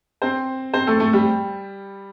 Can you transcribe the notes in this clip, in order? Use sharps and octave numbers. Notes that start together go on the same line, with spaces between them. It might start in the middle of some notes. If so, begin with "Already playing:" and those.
C4 C5
C4 C5
A3 A4
A3 A4
G3 G4